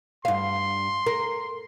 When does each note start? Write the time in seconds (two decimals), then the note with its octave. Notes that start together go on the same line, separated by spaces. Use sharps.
0.25 G2 F5 C6
1.06 A#4